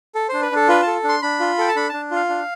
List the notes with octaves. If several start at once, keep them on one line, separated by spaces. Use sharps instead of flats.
A4
D4 C5
B4
D4 A4
F4 B4
A4 A5
D4 C6
D4 B5
F4
A4 G5
A5
D4 B5
D4 A5
F4 F5
D4